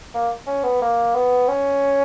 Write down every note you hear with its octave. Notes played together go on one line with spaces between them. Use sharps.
A#3
C#4
B3
A#3
B3
C#4